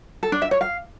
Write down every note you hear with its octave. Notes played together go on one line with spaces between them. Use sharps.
A4
D4
E5
C#5
F5